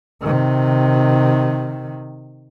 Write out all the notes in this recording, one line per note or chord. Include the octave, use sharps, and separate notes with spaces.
C3 D#3